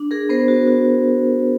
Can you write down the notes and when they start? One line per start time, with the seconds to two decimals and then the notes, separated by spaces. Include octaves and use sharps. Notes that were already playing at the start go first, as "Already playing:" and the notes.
Already playing: D4
0.11 G#4 A#4
0.29 B3 A#4 C5
0.48 F#4
0.68 F#4